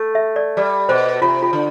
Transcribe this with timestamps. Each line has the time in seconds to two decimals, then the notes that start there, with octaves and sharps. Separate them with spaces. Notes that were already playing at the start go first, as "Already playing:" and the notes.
Already playing: A3
0.15 E5
0.36 D5
0.57 G3 D5
0.89 B2 C5
1.22 C3 F4
1.43 F4
1.53 D3